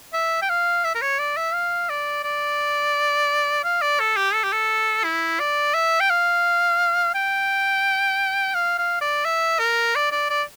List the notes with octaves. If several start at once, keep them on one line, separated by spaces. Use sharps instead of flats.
E5
G5
F5
E5
A#4
C#5
D5
E5
F5
D5
D5
F5
D5
A4
G4
A4
G4
A4
E4
D5
E5
G5
F5
G5
F5
F5
D5
E5
A#4
D5
D5
D5